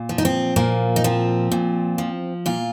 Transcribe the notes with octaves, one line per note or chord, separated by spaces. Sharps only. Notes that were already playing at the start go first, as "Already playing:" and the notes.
Already playing: A#2
F3
D#4
C4
A#2 A#3
D#4
F3 C4
A#2
F3
A#2 F4